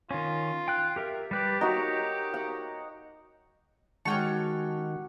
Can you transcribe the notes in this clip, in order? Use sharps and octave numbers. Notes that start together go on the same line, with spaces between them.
D#3 C#4 F4
G5 F#6
G4 A#4 E5
G3 G4 B4 D5
D#4 F#4 A#4 C#5
F#5
D#3 G#3 C#4 F#4 G4 G5 A5 C#6